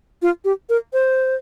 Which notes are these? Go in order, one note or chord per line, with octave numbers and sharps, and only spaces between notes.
F4
G4
A#4
C5